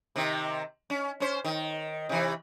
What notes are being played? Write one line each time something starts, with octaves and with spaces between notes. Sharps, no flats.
C3 D#3
C#4
C#4 C5
D#3
C3 E3